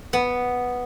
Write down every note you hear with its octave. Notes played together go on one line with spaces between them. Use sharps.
B3